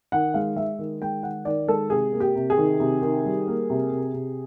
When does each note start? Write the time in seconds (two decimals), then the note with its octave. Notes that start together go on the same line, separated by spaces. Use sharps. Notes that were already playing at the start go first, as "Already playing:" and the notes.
0.12 D#3 F#5
0.34 G#3 F5
0.56 G#3 E5
0.79 D#3
1.01 G#3 G5
1.23 D#3 F#5
1.45 D#3 D5
1.68 G#3 A4
1.90 C3 G#4
2.13 A#3
2.20 G4
2.35 C3
2.50 G#4
2.58 D#3
2.80 C3
3.02 D#3
3.25 G3
3.47 A#3
3.70 C3
3.92 C3
4.13 C3